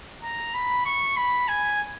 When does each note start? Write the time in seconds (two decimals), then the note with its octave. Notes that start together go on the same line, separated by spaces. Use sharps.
0.23 A#5
0.54 B5
0.85 C#6
1.16 B5
1.48 G#5